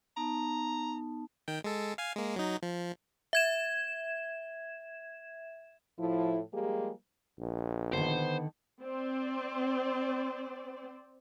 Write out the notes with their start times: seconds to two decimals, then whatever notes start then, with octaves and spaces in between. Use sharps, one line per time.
0.17 B3 D#4 A5 A#5
1.48 D#3 G5
1.64 G#3 A4
1.98 F5 G#5
2.16 G#3 A#3
2.36 F#3 D#4
2.63 F3
3.33 E5 G#6 E7
5.99 A2 F3 E4
6.53 F3 G3 G#3 A#3 G4 G#4
7.39 A#1
7.93 D3 D#3 B3 C5
8.82 C4 C5 D5